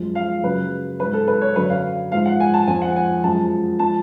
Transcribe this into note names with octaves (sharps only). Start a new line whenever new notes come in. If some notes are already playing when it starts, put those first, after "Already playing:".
Already playing: F#2 F3 G#3
F5
F#2 C#3 F#3 B4
G#2 F#3 B4
A4
B4
C#5
F#2 D3 F#3 B4
F5
G#2 F3 G#3 F5
F#5
G#5
A5
F2 F3 G#3 G#5
F#5
G#5
F#2 F3 G#3 A5
F3 G#3 A5